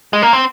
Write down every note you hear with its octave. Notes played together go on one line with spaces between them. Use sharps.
G#3
A#3
C4